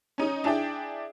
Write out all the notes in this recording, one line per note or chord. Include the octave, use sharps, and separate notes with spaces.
C#4 D#4
D4 E4 G#4 D5 G5